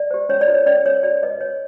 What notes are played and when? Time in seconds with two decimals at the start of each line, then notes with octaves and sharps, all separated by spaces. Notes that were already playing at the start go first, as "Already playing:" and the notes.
Already playing: D5
0.11 G4 C5
0.29 C#4 C#5
0.41 D5
0.48 F4 A4 C5
0.54 C#5
0.66 C#4 D5
0.85 F4 A4 C5 C#5
1.03 F#4 D5
1.23 B4 D#5
1.41 F#4 C#5